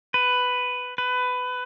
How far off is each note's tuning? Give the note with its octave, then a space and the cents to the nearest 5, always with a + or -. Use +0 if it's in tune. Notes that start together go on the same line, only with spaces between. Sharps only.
B4 +10
B4 +20